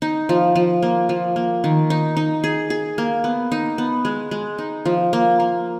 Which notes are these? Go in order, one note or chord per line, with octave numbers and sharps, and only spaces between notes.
D#4
F3
F3
A#3
F3
A#3
D#3
D#4
D#4
G#4
G#4
A#3
B3
D#4
B3
G#3
G#3
D#4
F3
A#3
A#3